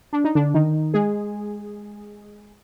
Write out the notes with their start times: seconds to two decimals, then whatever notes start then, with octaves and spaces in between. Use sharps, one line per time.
0.13 D4
0.24 D#4
0.35 D3 D4
0.54 D#3 D#4
0.94 G#3 G#4